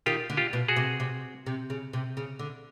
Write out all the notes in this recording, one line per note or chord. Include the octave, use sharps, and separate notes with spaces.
D#3 F4 G4
D3
F4 G4
B2
F#4 G#4
C3
C3
C3
C#3
C3
C#3
D3